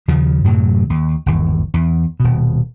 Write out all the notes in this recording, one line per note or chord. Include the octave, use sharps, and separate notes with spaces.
D#2 C#3 F3
F#2 A2 C3 F#3
D#2
G1 D#2 E3
E2
D#1 B2